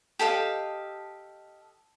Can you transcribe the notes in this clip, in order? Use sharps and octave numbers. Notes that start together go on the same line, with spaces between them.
G4 A4 D#5 F5